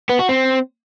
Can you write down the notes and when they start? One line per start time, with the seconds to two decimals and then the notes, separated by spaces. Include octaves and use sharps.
0.09 B3
0.19 F#4
0.29 C4